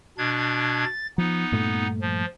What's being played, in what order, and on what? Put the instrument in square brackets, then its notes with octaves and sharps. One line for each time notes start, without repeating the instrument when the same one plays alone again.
[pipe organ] B2 D4 G#6
A6
[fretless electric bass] F3 [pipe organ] B3 D#4
[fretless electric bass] G2 A#2 A3
[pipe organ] F3